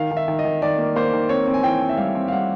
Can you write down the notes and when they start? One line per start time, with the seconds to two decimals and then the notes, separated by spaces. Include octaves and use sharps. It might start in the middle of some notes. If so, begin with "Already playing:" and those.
Already playing: D#3 F5
0.11 D#3
0.17 E5
0.28 D#3
0.39 D#5
0.45 D#3
0.62 D#3 D5
0.78 A#3
0.96 A#3 C5
1.13 D#3
1.29 C4 C#5
1.47 C4
1.54 G#5
1.63 E3 G5
1.81 C4
1.89 E5
1.97 G3 F5
2.15 C4
2.28 F5
2.32 G3 F#5